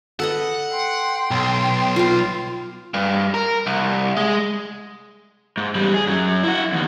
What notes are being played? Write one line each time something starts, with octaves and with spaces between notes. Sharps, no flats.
A4 B4 D#5 F#5
G5 C6
B1
F4 F5
G2
A#4
C2
G#3
G#2
E2 G3
G#4
F#2 F#3
E4 F#4
E2 D#3